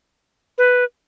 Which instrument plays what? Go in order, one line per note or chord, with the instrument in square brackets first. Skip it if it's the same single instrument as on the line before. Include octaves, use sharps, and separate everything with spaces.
[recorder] B4